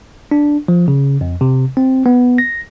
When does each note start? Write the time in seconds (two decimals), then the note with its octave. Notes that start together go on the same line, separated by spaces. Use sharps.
0.31 D4
0.68 F3
0.88 C#3
1.21 F2
1.41 C3
1.77 C4
2.06 B3
2.38 A#6